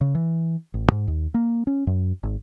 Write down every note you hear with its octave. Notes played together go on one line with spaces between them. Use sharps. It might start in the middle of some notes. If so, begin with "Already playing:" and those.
C#3
E3
A1
G#2
D#2
A#3
C#4
F#2
G#1